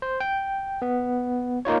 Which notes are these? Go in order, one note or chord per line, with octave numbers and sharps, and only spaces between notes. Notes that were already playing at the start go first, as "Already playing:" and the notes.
C5
G5
B3
A#3 D#4 F4 C#5